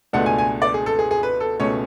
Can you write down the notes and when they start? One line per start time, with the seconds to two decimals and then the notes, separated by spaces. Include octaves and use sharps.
0.13 C#2 B2 A3 D4 F#5
0.26 G#5
0.38 G#5
0.62 D5
0.74 G#4
0.86 A4
0.99 G#4
1.11 G#4
1.23 B4
1.40 A4
1.60 C#2 B2 A3 C#4 C#5